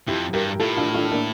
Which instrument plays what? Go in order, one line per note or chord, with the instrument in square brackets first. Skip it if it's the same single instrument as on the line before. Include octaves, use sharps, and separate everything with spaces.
[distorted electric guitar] F2 [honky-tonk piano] E4 G4
[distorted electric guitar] G2 [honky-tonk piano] G4 A#4
[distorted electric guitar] A2 [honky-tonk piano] F4 A4
[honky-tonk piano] D4 F4
D4 F4
A#3 D4